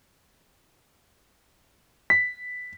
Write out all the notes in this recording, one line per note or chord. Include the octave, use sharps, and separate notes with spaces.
B6